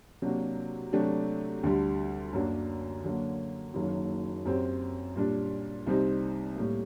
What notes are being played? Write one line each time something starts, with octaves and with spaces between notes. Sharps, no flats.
C3 F#3 A#3 D4 F#4
C3 F#3 A3 D4 G4
D2 D3 G3
F#2 F#3 A#3 D4
D3 F#3 A#3
F#1 F#2 D#3 F#3 A#3
F#2 F#3 C4 G4
A#2 G3 D4
C2 C3 G3 C4 D#4
A2 G3 A#3